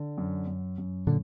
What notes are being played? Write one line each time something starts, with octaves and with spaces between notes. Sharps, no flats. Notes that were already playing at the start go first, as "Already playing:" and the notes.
Already playing: D3
F#2
F#2
F#2
A#2 D3